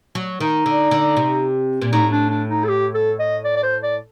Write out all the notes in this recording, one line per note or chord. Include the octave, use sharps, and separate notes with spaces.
F#3
D#3 D#4
D3
D3
C3
A#2
A2 D#4
D4
D4
D#4
A4
G4
A4
D#5
D5
D5
C5
D5